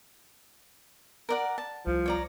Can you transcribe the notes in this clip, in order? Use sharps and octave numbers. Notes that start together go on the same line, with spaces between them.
A#4 D5 F#5
A5
C2 F3
C#5 D5 A#5